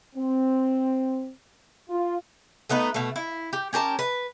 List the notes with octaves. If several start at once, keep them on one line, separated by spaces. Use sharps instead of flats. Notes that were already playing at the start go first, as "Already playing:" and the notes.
C4
F4
A3 B3 D#4 B4
B2 A3
E4
G4
C#4 G4 A#4 A5
B4